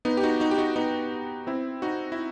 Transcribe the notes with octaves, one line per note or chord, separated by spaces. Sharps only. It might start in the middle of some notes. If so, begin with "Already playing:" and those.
B3 D#4
G4
D#4 F#4
D#4 F#4
G4
D#4 F#4
B3 D#4
C4 E4
D#4 F#4
E4